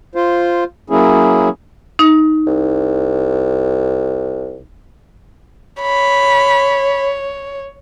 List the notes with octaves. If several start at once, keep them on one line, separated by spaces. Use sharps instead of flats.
F4 C5
F#3 A#3 C#4 E4 G#4
D#4
C2
C#5 B5